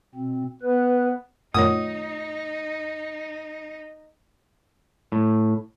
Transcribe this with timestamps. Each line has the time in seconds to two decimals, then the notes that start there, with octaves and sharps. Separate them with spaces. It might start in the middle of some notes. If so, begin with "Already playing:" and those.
0.15 B2 C4
0.62 B3 B4
1.54 F#2 A#2 D#3 A3 D#4 F4 C#5 D#6
5.12 A2